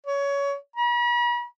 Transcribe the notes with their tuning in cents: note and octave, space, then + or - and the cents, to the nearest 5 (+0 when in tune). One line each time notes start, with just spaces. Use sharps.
C#5 +20
B5 -45